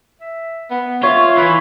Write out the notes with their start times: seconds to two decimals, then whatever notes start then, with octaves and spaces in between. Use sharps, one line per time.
0.21 E5
0.71 B3
1.03 F4 C#5 E5
1.37 E3 B5